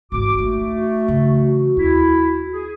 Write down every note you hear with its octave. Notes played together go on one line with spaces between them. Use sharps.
G#1 E3 F#4 D6
A3 D#4
C#3 E3
D#2 E4
G#4